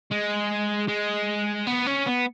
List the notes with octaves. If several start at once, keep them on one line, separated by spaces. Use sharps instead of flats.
G#3
G#3
B3
C#4
B3